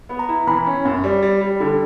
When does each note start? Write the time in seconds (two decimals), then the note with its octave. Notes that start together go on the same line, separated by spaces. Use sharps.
0.09 B3
0.19 A#5
0.29 E4
0.47 E3 B5
0.66 C#4
0.85 F#2
1.04 G3
1.22 G3
1.41 G3
1.60 D3